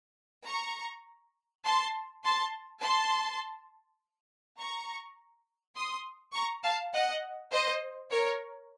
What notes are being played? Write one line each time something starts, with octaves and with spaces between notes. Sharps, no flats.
A#5 C#6
A5 C6
A5 C6
A5 C6
A#5 C#6
C6 D#6
A#5 C#6
F5 A5
D#5 F#5
C5 D#5
A#4 C#5